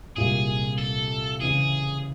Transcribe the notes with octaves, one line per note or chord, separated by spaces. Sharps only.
C2 A#2 G3 G#4
A4
C#3 E3 G#4